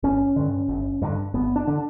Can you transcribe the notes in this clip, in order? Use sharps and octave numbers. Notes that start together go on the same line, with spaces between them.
G1 C#4
G2 D3
G1
G2 D3
G1 B3
D4
D3 D4